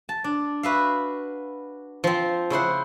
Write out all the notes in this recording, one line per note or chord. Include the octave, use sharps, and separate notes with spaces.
A5
D4
F#4 B4 E5 F5
F3 C4
C#3 E4 C5 F#5